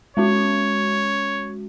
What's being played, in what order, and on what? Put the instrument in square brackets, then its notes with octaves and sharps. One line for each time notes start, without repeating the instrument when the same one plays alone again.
[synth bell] G#3 C#4 F#4 [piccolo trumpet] C#5